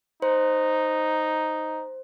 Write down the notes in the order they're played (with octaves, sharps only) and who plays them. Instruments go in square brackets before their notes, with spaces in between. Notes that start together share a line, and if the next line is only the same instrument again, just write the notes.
[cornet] D#4 [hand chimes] C5